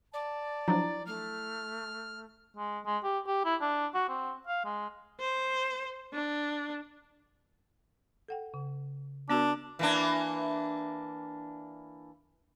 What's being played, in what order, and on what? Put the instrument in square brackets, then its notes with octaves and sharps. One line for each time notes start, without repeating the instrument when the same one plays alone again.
[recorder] D5 [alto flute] A5
[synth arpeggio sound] F3 F#3 D4 [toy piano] E4
[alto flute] A3 [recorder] F6
[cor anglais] G#3
G#3
G4
G4
E4
D4
F#4
C4
F5
G#3
[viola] C5
D4
[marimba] A4 F#5 G5
C#3
[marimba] B3 F#4 A#4 [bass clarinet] D4
[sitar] E3 A#3 D4